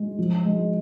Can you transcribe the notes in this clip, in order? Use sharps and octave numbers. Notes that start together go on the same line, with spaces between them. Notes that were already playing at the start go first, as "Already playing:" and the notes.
Already playing: G#3
F3
G#3